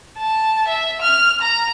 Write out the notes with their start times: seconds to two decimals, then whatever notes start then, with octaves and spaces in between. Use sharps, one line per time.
0.18 A5
0.68 E5
1.02 F6
1.41 A#5